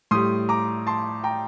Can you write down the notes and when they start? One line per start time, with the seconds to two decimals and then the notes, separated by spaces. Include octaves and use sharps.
0.11 A2 G3 C6 D#6
0.49 A#5 D6
0.87 A5 C6
1.24 G5 A#5